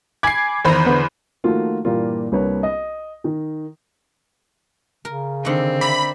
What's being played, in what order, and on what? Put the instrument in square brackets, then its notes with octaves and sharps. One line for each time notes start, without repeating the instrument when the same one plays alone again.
[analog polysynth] G#5 B5 D6 [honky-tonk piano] G#6 C7
[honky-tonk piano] E2 C5 B5 [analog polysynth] D#3 A#5
[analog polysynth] D3 B3
[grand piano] D#3 F3 A3 A#3 F4 F#4
G2 A#2 E3 G3 A#3 F4
C2 A#3 D4 B4 C#5
D#5
D#3
[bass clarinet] C#3 [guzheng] A#4
[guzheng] D3 D#3 [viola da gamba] C4
[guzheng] D5 E5 A#5 [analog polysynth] B5